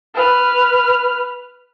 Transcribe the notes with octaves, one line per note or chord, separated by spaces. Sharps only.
B4 F6